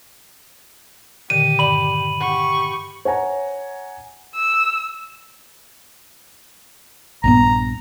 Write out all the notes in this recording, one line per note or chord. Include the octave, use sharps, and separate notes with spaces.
A#2 D3 D#3 G4 D#7
G2 D5 B5 F#7
G4 F#5 C#6
C#5 F#5 G#5 A#5
E6
A#1 G2 B3 A#5